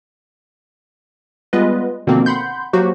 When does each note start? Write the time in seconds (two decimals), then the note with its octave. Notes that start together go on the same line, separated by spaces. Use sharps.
1.53 G3 G#3 B3 F4 B4 D#5
2.07 B2 D3 D#3 F3 A#3 C4
2.26 F#5 B5 C6 G6
2.73 F3 F#3 A#3 F#4 G4 C5